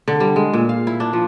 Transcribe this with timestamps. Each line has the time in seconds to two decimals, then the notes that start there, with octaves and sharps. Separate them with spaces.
0.08 D3
0.20 G3
0.36 G#3
0.53 A#2
0.69 F5
0.87 E4
1.00 D4
1.13 F3